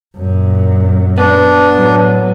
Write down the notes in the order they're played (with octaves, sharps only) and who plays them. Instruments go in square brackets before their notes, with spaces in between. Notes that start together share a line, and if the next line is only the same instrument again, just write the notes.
[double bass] F#2 A#2
[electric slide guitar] B3 [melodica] D4
[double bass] A2 F#3